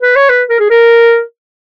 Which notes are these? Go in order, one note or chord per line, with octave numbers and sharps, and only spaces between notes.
B4
C#5
B4
A#4
G#4
A#4